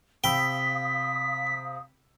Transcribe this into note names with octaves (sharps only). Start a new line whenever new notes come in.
C3 F5 G5 B5 D#6 E6 B6